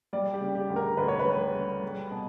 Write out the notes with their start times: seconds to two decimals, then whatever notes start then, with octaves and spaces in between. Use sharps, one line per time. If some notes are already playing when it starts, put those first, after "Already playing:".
0.13 G3 D5
0.34 G4
0.41 C#3
0.55 G4
0.70 D2
0.76 A#4
0.97 D2 B4
1.08 C#5
1.19 B4
1.27 G3
1.54 C#3
1.83 G3
2.11 B2